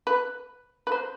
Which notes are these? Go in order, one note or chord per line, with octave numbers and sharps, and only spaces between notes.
B4
B4
C5